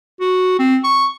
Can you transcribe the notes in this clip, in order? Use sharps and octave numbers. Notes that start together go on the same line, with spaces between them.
F#4
C4
C#6